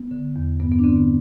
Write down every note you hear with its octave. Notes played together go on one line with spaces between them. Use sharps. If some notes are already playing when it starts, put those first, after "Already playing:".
Already playing: B3
D3
E2
G2 B3
B3
D4
D3 C4
B3